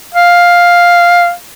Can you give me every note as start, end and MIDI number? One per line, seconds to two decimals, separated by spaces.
0.15 1.32 77